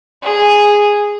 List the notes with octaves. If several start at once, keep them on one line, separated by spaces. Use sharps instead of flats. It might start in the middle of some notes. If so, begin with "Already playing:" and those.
G#4